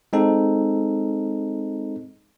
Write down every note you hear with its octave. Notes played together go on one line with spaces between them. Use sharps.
G#3 C4 D#4 A4